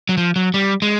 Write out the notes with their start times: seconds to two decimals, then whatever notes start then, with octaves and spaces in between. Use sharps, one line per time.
0.09 F#3
0.17 F3
0.36 F#3
0.54 G3
0.82 G#3